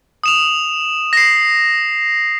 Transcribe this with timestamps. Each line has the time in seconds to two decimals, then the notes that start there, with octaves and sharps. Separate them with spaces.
0.24 D#6 E7 F7
1.13 A#6 C7